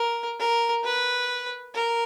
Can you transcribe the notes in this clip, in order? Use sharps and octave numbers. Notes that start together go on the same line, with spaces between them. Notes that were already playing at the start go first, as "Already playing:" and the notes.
Already playing: A#4
A#4
B4
A#4